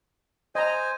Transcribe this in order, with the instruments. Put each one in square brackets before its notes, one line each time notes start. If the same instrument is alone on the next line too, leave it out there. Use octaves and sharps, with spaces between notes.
[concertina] C5 G#5 [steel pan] D#5 A#5